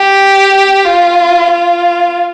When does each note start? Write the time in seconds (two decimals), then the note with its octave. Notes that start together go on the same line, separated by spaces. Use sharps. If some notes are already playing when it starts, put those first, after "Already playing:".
Already playing: G4
0.85 F4
1.50 F4